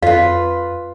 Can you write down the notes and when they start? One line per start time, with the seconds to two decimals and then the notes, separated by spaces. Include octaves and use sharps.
0.03 F2 F4 B4 F5